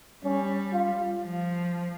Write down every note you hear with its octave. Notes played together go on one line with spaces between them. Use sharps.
G3 C#4
F4
F3